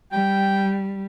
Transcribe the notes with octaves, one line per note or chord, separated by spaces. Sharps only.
G3 G5